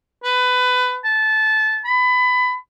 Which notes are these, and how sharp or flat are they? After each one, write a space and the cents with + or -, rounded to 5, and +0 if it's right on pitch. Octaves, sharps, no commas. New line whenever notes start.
B4 +20
A5 -20
B5 +20